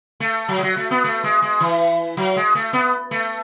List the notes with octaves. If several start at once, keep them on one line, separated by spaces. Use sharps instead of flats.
A3
F#3
G#3
F#3
A3
B3
A3
G#3
G#3
E3
F#3
G#3
A3
B3
A3